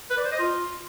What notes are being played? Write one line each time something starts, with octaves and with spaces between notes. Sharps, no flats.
B4
D5
C5
D#5
F4